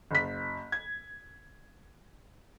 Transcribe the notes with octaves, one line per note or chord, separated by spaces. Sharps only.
F#1 B6
G#6